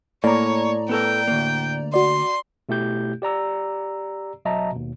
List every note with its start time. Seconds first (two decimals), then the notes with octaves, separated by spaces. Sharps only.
0.24 A2 A#3 C#5 D5 A#5
0.89 B3 A4 A#4 G5
1.28 D2 A#3
1.94 F#4 D5 C6
2.69 B2 A3 E4 G4 G6
3.22 G4 D5 A#5 E6
4.45 B1 F#3 D#5 E5 A5 A#5
4.72 D#2 B2